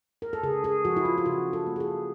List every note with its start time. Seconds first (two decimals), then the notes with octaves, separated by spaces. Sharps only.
0.22 A#4
0.33 A4
0.43 C#3 G#4
0.64 G#4
0.85 F3 F#4
0.96 E4
1.05 F4
1.18 F4
1.25 C#3 F#4
1.53 A4
1.67 A#3
1.76 G#4
1.80 A4